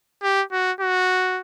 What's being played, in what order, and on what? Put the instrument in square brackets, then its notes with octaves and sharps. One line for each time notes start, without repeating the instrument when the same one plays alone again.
[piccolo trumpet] G4
F#4
F#4